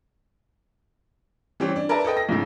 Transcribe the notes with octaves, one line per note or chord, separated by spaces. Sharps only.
E3 G3 C4 C#4
D4
A#4 B4 D5 E5 A5 A#5
A4 B4 D#5 G5
A#6
B1 G#2 C#3 E4